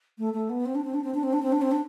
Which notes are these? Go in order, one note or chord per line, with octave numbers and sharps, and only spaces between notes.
A3
A3
B3
C4
D4
C4
D4
C4
D4
C4
D4
C4
D4
C4
D4